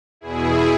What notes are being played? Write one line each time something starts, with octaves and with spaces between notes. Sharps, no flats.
E2 B2 E4 G#4